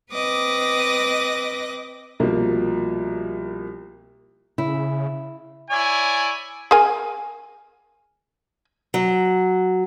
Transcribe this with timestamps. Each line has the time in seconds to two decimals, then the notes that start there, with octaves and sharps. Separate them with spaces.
0.11 C4 B4 D#5 D6 F#6 A#6
2.20 C2 B2 F3 A#3
4.58 C#3 E4
5.70 E4 C#5 D5 G#5
6.71 G#4 A#4 G#5
8.94 F#3